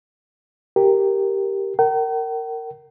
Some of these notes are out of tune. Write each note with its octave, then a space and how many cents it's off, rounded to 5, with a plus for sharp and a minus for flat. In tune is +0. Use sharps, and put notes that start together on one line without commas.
G4 +0 A#4 -5
A#4 -20 G5 -45